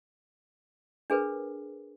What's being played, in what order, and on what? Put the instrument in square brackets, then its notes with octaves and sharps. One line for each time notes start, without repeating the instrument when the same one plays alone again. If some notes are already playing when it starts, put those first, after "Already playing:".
[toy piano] D4 G#4 A#4 B4